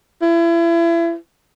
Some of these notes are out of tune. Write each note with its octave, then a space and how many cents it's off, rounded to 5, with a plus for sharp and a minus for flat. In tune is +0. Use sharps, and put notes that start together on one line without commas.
E4 +35